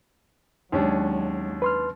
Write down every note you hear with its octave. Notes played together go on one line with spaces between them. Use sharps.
D#2 F#3 G#3 C#4 D4
B4 C6 F6